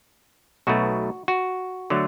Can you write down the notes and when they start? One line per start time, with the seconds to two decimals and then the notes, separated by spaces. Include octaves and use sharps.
0.67 B1 B2 A3 F#4
1.28 F#4
1.90 D3 F#3 A3